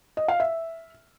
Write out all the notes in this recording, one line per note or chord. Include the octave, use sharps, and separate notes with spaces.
D#5
F5
E5